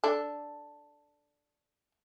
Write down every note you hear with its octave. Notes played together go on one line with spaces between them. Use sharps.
D4 A4